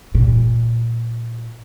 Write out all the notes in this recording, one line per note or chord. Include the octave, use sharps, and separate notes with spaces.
A#2